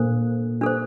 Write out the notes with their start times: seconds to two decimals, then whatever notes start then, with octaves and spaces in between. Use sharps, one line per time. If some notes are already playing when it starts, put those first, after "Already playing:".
Already playing: A#2 A#3 D4 A4 C5
0.61 D4 A4 C5